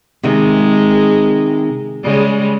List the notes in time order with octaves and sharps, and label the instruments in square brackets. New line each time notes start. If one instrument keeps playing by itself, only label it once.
[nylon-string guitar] C3 D#3 [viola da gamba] G#3
[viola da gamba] C#3 G3 G#3